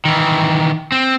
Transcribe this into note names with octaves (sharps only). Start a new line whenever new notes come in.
D#3 E3
C4